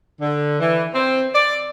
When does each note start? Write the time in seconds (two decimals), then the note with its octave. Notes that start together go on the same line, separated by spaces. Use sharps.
0.21 D3
0.59 E3
0.94 C4
1.35 D5